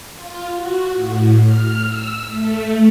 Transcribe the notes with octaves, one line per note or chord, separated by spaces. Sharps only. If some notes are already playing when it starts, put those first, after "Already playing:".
F4
F#4
A2
F6
E6
A3